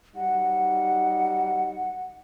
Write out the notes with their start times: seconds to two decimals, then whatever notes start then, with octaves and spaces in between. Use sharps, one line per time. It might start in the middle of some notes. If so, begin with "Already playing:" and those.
0.16 F#3 G3 D#4 F#5